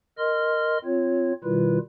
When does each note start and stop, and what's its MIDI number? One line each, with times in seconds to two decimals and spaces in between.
0.18 0.78 70
0.18 0.78 75
0.18 0.78 84
0.18 0.78 89
0.85 1.33 60
0.85 1.33 65
0.85 1.33 73
1.44 1.78 47
1.44 1.78 51
1.44 1.78 55
1.44 1.78 64
1.44 1.78 65
1.44 1.78 71